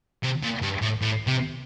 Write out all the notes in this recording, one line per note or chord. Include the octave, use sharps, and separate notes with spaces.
C3
A#2
G2
A2
A2
C3